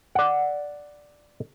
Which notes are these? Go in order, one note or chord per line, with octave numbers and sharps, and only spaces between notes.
D5 F#5